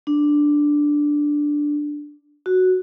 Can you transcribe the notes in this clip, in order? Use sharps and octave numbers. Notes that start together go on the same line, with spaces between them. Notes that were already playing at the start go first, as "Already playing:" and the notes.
D4
F#4